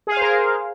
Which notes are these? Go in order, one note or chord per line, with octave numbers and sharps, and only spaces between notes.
G#4 A#4 C5 F5